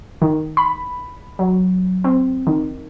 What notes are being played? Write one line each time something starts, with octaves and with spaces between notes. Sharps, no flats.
D#3
B5
F#3
C4
D#3